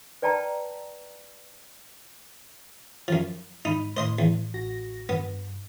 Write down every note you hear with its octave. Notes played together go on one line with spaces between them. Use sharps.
B4 D5 G5 A5 A#5
F#2 F3
G#2 D#4 B5
A2 C5 D#5 C6
E2
A1 F#4 A#6
G2 B3